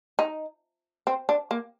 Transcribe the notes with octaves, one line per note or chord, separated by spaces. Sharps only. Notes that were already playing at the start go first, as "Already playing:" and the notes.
D#4
C4
D4
A#3